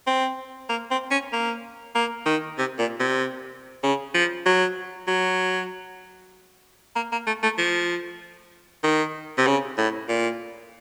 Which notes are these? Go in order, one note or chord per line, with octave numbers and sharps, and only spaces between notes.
C4
A#3
C4
C#4
A#3
A#3
D#3
C3
A#2
C3
C#3
F3
F#3
F#3
A#3
A#3
A3
A3
F3
D#3
C3
C#3
A2
A#2